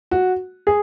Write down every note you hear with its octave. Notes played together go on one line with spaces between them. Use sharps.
F#4
G#4